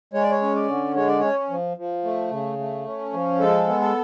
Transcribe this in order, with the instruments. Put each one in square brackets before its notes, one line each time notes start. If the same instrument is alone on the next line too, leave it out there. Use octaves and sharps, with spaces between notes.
[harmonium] G#3 C#5
D5
C#5
C#4
D5
D3
G#3 C#5
D5
C#4 C#5
F3
F3
A3
C#3
A3
C#4
F3
G#3 A4
B3
A4